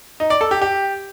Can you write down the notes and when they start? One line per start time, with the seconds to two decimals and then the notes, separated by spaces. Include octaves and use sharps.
0.20 D#4
0.30 D5
0.41 A4
0.51 G4
0.61 G4